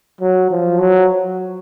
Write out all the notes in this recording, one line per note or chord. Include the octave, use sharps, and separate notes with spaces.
F#3
F3
F#3